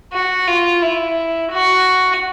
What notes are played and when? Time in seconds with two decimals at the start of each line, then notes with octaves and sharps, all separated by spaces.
0.13 F#4
0.47 F4
0.82 E4
1.51 F#4